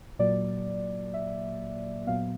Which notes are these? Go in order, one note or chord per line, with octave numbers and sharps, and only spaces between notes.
A#2 F#3 A#3 D5
E5
A#2 F#3 B3 F5